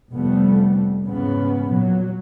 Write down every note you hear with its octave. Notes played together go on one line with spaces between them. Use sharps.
F1 F2 G3 A3 B3
E2 G#2 C#3 B3
A#2 F#3